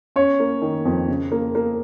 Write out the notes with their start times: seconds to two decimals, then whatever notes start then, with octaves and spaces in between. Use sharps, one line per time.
0.16 C#4 C#5
0.40 A#3
0.62 D#3
0.85 F2
1.08 C#3
1.32 A#3
1.55 A#3